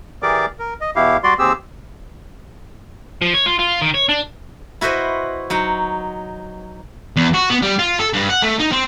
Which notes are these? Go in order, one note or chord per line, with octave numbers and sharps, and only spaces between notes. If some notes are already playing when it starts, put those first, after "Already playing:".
E3 G4 G#4 A#4 D5 D6
A#4
D#5
E2 B2 E4 G4 F5
G3 F#4 D5 C6
D#2 C4 G4 G#4 E6
F3
C#5
F4
F4
D#3
C#5
D4
E4 F#4 B4 C5 D#5
F#3 D#4 F#5
E2
F#4
B3
G3
F4
A4
G2
F#5
A3
D#4
C4